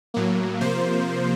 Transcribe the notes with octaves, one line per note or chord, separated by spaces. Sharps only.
A2 F#3 A#3
C3 F3 A#3 C5